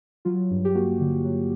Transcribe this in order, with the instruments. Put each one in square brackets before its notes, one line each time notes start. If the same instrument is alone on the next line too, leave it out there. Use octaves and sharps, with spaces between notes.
[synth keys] F#3 F4
G2
G4
A#3 F#4
D3
F#3